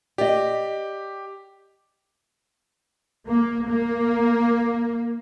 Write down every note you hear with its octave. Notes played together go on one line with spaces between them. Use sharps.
G4 D5 D#5
A#3
A#3